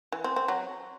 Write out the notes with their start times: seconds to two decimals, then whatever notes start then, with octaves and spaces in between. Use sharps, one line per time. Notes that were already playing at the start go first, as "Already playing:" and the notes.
0.12 E3
0.24 C4
0.36 C4
0.48 F#3